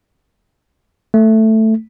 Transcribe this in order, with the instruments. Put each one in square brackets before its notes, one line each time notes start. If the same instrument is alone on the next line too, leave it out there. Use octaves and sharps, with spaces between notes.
[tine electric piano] A3